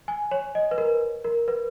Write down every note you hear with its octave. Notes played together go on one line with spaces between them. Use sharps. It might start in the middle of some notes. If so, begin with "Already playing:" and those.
G#5
C#5
D#5
B4
A#4
A#4
B4